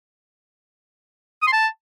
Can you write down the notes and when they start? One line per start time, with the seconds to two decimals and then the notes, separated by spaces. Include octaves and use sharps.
1.42 D#6
1.47 C6
1.53 A5